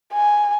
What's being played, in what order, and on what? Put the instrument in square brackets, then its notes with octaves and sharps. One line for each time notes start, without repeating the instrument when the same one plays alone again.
[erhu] G#5